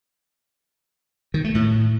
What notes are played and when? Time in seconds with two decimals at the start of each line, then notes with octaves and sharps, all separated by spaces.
1.34 D#3
1.44 A3
1.55 A2